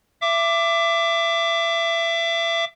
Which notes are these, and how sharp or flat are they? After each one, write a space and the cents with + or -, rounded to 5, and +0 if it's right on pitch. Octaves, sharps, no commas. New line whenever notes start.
E5 +25 D6 +0